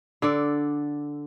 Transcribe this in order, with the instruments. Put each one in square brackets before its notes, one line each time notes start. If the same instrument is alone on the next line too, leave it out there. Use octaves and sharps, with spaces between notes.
[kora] D3 A4 D5